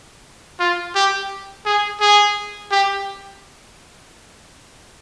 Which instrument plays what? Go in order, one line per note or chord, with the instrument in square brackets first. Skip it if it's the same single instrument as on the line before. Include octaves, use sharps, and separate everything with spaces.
[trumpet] F4
G4
G#4
G#4
G4